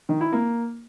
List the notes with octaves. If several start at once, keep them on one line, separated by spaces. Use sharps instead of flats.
D#3
E4
A#3